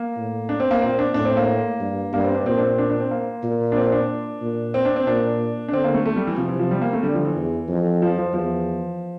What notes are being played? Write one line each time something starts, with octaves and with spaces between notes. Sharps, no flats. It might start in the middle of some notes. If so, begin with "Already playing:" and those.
Already playing: A#3
A2
D4
C4
A#3
A#2 C4
D4
A2 D4
C4
A#3
G2
G2 A#3
C4
D4
A#2 C4
D4
C4
D4
D4
C4
A#3
A#2
D4
C4
C4
D4
A#2
C4
D4
C4
A#2 D4
D4
D3 C4
A#3
A3
A3
G3
E3
C3 F3
E3
F3
G3
A#3
A3
D3 G3
F3
E3
E2
F2
F3
F3
E2 F3